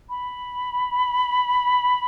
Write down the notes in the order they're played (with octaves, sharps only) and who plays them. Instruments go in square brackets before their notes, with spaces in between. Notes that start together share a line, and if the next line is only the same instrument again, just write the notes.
[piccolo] B5